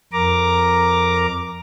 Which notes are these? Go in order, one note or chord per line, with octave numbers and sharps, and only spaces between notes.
F2 A#4 A#5 D6